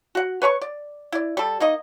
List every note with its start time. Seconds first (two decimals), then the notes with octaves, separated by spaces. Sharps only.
0.15 F#4 F#5
0.42 B4 C#5 A#5 C#6
0.62 D5
1.12 E4 D5
1.37 G3 A4
1.60 A#3 D#4 D#5